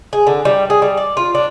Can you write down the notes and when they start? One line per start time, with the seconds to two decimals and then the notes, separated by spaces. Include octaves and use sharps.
0.13 G#4
0.27 D3
0.45 G3
0.70 G#4
0.82 G3
0.97 D5
1.17 F4
1.35 D4